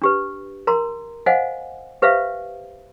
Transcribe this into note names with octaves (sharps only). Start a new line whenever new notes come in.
D4 G4 B4
A#4 A#5 C6
C5 D#5 F5 F#5 G#5
G4 B4 C5 E5 F5